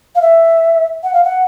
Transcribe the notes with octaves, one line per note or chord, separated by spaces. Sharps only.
F5
E5
F#5
F5
F#5